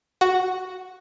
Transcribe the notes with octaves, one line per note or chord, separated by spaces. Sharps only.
F#4